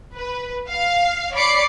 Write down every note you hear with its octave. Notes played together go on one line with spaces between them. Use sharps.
B4
F5
C#5 D5 B5 D6 C7 C#7